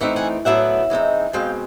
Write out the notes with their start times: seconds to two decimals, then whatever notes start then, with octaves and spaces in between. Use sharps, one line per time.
0.01 E3 A3 C4 D#4 E5 F#5
0.16 F#5 G#5
0.45 A2 F#3 B3 D4 E5 F#5
0.90 E3 G#3 C4 D#4
1.33 B2 G#3 C4 F5 G5